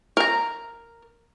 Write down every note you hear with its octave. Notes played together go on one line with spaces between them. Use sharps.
A#4 A#5